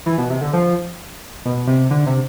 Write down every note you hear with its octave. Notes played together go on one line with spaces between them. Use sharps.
E3
B2
C3
D3
F3
B2
C3
D3
C3